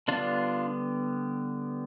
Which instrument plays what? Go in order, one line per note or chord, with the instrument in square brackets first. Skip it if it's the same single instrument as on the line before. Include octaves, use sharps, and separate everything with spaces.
[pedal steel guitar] D3 G3 B3 D4 F4